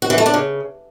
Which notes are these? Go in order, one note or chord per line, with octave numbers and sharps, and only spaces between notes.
F#4
E3
A3
D4
C#3